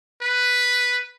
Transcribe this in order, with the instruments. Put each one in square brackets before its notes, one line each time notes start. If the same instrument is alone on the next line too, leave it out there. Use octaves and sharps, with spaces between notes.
[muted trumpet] B4